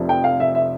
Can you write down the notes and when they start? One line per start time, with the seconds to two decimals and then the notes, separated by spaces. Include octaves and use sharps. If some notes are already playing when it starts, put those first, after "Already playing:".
Already playing: F1 F2 C3 F3
0.09 G5
0.24 F5
0.40 E5
0.55 E5